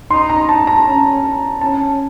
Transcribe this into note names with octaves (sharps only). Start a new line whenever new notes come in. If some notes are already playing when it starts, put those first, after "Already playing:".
D#4 C6
A#5
A5
A#5
C#4
C#4 A5